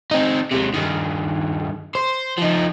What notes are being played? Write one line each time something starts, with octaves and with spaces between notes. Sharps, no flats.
C4 D#4
C3 G#3
G2 D#3
C5
F3 D#4